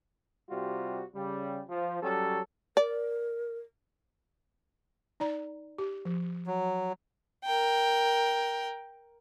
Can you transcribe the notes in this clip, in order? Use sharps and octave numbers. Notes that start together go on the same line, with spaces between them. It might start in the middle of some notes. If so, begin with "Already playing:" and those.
C3 G3 F4 F#4
C#3 G3
F3
F#3 G3 C#4 A4
A#4 D5
D#4 D5 A#5
G4
F3
F#3
A#4 G5